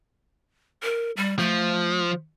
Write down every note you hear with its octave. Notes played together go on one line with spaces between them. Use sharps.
A#4
G3
F3 A3